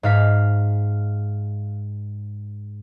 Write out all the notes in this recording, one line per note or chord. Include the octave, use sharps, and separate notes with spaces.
G#2 F5 B6